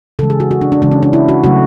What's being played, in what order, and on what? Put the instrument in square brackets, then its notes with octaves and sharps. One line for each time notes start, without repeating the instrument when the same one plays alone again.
[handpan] C#3 E3 G#3 A4
G#4
F#4
F#4
D4
D4
C#3 E3 G#3 D4
C#4
D4
E4
F#4
C#3 F#3 A3 F#4